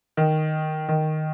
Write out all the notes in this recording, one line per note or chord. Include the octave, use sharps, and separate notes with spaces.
D#3
D#3